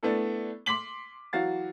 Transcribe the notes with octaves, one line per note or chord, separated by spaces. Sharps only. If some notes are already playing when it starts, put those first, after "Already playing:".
A3 B3 D4 E4 A4
C6 D6 B6 F#7
E3 F#3 F#4 F5 A6